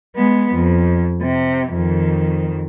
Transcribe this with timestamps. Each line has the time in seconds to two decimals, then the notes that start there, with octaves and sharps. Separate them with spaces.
0.16 G#3 B3
0.54 F2
1.21 C3
1.74 F2 D#3